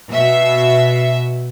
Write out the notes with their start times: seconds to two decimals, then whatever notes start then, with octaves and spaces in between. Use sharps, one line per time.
0.11 B2 E5